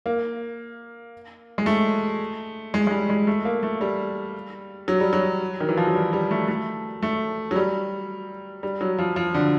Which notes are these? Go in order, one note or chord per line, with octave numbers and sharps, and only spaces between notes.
A#3
G#3
A3
G#3
G#3
G3
G#3
A3
A#3
A3
G3
F#3
G3
F#3
D#3
E3
F3
F#3
G3
G3
A3
A3
A3
F#3
G3
G3
F#3
F3
F3
D3